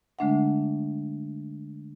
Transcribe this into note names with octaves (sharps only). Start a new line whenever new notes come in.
D3 G#3 A3 D4 E5 F#5